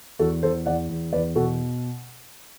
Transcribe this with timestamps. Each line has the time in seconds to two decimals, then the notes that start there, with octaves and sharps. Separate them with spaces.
0.19 E2 F#4 A4
0.43 E2 A4 C5
0.66 E2 D5 F#5
0.89 E2
1.13 E2 B4 D5
1.36 B2 F#4 A4